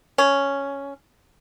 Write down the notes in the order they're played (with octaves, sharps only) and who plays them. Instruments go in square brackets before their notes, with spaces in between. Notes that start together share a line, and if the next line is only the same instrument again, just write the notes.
[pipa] C#4